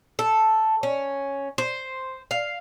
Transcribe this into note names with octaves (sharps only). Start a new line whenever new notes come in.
A4
C#4
C5
F5